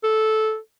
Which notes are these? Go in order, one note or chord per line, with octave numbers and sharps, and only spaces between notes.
A4